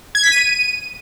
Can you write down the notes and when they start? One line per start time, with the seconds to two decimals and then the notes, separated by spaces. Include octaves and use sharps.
0.15 G#6
0.23 B6
0.32 D#7